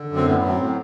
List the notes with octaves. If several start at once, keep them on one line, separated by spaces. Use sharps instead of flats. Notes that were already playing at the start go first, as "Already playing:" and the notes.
Already playing: D3
F#2
C4
A2 B3
F#3
C4
A2